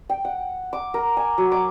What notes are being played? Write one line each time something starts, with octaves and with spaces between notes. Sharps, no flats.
G5
F#5
D6
A#4
G#5
F#3
D6